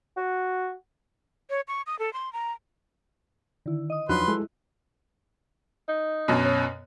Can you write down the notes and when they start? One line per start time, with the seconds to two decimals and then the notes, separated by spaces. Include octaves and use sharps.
0.17 F#4
1.50 C#5
1.68 C#6
1.87 D#6
1.99 A4
2.13 C6
2.33 A#5
3.66 D3 D#3 E4
3.90 D#5 D#6
4.09 E2 F3 F#3 D4 D#4 B4 C6 F#6
4.28 G#3 E4 G#4 A4
5.89 D#4
6.28 F#2 B2
6.45 C#4